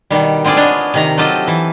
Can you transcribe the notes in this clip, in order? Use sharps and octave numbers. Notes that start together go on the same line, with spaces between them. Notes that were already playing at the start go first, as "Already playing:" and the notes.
B2 D#3 G3
D3 C4 F4 G#4 D5
B3 D4 C#5 D#5
C3 D#3 A#5
F#3 C4 F4 G4 A4 D#5
E3